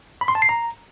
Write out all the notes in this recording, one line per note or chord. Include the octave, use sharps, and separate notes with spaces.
B5
C6
A5
C7
A#5